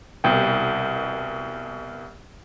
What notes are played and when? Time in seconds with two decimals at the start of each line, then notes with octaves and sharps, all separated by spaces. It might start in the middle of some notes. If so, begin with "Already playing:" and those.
0.24 C2 B2 G5